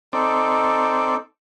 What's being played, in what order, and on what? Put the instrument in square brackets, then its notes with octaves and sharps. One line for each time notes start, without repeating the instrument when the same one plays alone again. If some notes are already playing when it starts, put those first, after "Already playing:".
[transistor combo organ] C4 D5 [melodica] D#4 A4